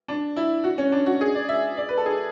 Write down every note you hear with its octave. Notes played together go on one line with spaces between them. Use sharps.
D4
E4
F#4
C#4
D4
F#4
G#4
D5
E5
D5
B4
A4
G#4